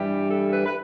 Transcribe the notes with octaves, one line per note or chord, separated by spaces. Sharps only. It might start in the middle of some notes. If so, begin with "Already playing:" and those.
Already playing: G2 E3 G3 G4
A4
B4
B4